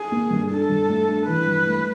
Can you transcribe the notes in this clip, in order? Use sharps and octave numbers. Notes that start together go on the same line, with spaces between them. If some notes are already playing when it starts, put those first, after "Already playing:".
Already playing: G#4
A#3
G2
D4 A4
G2
A3
D4
E3 B4
G2
A3